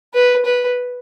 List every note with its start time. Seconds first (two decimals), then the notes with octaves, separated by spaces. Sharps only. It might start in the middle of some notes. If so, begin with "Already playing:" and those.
0.14 B4
0.45 B4